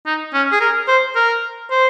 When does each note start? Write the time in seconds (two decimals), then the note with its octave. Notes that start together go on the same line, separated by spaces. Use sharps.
0.06 D#4
0.34 C#4
0.52 G#4
0.61 A#4
0.88 C5
1.16 A#4
1.70 C5